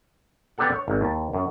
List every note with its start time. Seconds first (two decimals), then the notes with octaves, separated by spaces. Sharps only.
0.58 B3 C4 D4 G4 A4 F#5
0.76 C#5
0.88 G#1
1.01 D#2 A5
1.33 F#2